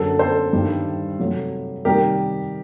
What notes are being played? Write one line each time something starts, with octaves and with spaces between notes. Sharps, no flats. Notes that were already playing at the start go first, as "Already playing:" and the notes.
Already playing: F#2 D3 F#3 A#3 A4
A4 C5
G2 D#3 G3
C3 F#3 A3
C3 D#3 G3 A#3 G4 A#4